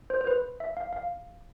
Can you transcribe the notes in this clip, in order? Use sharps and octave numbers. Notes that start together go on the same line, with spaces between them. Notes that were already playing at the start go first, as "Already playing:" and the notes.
C5
C5
B4
E5
F5
F5